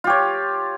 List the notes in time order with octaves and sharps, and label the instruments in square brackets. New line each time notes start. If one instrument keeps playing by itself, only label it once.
[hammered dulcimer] F4
G4
C#5